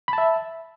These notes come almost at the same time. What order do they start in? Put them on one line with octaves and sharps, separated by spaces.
B5 A5 E5